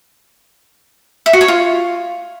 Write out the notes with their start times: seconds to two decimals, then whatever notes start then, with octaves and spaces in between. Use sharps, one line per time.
1.26 E5
1.33 F#4
1.41 C#5
1.48 F4